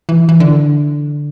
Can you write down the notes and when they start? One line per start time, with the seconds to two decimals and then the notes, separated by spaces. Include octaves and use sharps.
0.09 E3
0.29 E3
0.40 D3